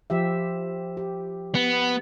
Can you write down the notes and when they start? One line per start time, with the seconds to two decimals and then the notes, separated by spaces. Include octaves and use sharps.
0.10 F3 G4 E5
0.97 G4
1.55 B3